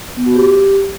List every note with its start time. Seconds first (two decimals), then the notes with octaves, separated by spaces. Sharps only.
0.17 B3
0.26 F#4
0.36 G4